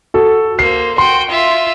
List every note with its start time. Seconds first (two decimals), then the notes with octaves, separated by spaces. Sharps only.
0.14 F#4 A4
0.59 A#3 C5 C7
0.98 F#4 G5 C6
1.29 F4 E5